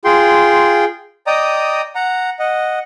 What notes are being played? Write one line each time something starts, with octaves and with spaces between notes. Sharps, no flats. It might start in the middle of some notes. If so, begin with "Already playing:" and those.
F4 G#4 G5 C6
D5 D#5 G5 A#5 D#6
F#5 A#5
D#5 F#5